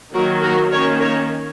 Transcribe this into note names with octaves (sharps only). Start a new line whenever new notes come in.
D#3 F#3 A#3 F#4 A#4
F#4 A#4
D#3 A#3 C#4 A#4 C#5
A#4 C#5